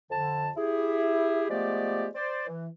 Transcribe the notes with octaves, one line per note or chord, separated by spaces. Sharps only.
F2 D3 A5
E4 G4 G#4
F3 G#3 A3 B3 G4 D5
C5 D5
E3